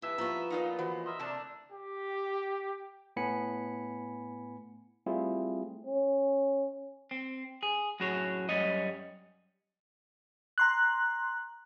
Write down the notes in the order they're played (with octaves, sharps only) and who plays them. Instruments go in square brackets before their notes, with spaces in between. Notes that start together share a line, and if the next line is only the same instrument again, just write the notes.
[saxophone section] G2 E5 [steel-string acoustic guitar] E3
[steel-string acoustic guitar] F3 B3 [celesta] A#5 C#6
[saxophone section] A#2 [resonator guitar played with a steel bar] D#4 F4 B4
[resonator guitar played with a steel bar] E3 [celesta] F#4 C5 F#5
[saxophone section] A#4 D#5 E5 [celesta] C6
[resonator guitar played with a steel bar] C3 A5 [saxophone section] A3 A#3 D4
[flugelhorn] G4
[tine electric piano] A2 B3 G#5 B5 C#7
G3 A3 C4 E4 F4 G#4
[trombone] C#4
[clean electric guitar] C4
G#4
F#2 A2 F#4 G#4 C#5
F#2 G3 C#5 D#5
[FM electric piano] A#5 C6 F#6